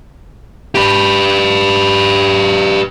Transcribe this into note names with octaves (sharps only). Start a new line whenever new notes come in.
G4 B4